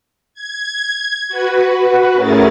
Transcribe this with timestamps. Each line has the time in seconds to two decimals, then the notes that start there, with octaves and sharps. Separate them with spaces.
0.34 G#6
1.29 F#4 B4
2.13 A2 C#4 E4 G#4 A#4 A6